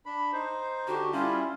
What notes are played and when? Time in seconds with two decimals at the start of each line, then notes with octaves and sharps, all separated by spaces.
0.06 D4 B5
0.33 D#4 C5
0.88 D3 D4 F#4 G4
1.13 G3 C#4 E4 F4